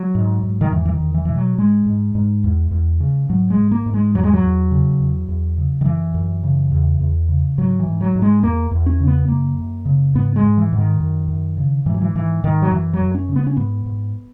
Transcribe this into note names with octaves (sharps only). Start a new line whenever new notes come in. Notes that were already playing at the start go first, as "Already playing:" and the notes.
Already playing: F#3
G#2
G#2
D#3
E2 E3
E3
D#3
E2
E3
B2 E3
F#3
G#2 G#3
G#2
G#2
E2
E2
C#3
G#2 F#3
G#3
G#2
A#3
G#2
G#3
E2 F#3
G#3
F#3
E2
C#3
E2
E2
C#3
D#3
F#2 E3
F#2
C#3
E2
E2
C#3
G#2 F#3
E3
G#2
F#3
G#2
G#3
E2 A#3
E2
C#4
C#3
B3
F#2 A#3
F#2
C#3
G#2 B3
G#3
G#2
E3
G#2
D#3
F#2
F#2
C#3
G#2 E3
F#3
E3
G#2 E3
G#2 D#3
F#3
F#2 E3
F#3
F#2
C#4
C#3
B3
C#4
G#2 B3
G#2